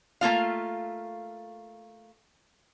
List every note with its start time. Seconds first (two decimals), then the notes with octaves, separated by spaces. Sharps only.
0.21 A3 A#3 F4 F5